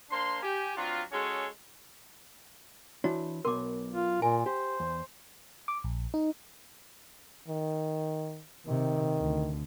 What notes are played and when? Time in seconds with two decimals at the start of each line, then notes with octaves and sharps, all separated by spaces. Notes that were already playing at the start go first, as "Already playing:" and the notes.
0.11 A#3 D4 C5 C6
0.42 G4 G#5
0.77 F#3 C4 D4 F4
1.12 G#3 C#4 F#4 G#4 A4 C#5
3.04 E3 D4 E4 F#4 C#5
3.45 B1 B2 A#4 C6 D6
3.93 F4
4.22 A#2 A#4 G#5
4.46 G4 C5
4.80 E2
5.68 D6
5.84 A#1
6.14 D#4
7.48 D#3
8.67 C3 D#3
9.18 D2